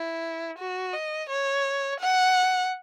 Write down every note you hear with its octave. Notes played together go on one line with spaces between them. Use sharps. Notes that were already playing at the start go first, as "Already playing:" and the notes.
Already playing: E4
F#4
D#5
C#5
F#5